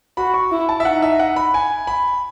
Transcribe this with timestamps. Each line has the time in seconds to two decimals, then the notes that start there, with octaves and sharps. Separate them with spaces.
0.17 F#4 B5
0.34 C#6
0.52 E4
0.69 A5
0.80 E5
0.85 D#4 F#5
1.02 E5
1.20 F#5
1.36 B5
1.54 G#5
1.87 B5